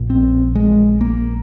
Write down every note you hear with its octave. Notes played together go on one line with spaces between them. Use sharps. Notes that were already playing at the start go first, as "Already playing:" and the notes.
Already playing: A#1 A#2
C4
G#3
A#3